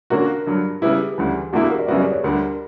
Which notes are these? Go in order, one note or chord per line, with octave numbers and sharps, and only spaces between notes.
D3 A#3 C#4 F#4 A#4
G2 D3 F#3
C#3 G3 B3 E4 G4
D2 C#3 E3 G3
E2 D3 A#3 E4 F#4
G4
A#4
D5
F#2 C#3 G3 B3 F#4 E5
D5
C#5
D2 D3 G3 A#4